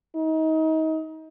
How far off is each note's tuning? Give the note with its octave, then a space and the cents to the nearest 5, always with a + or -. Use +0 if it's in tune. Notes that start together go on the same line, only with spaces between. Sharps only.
D#4 +30